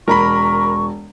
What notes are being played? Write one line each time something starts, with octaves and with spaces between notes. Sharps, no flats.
E1 A#4 A#5 B5 C#6